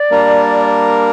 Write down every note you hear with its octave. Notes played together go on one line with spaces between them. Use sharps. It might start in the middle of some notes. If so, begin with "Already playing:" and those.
Already playing: D5
G3 A#3 D4 A#4